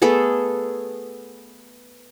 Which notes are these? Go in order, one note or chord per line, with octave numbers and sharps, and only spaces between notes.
A3 B3 G#4 A4